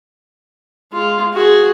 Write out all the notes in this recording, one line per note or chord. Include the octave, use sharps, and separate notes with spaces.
G#3 F4
F#4 G#4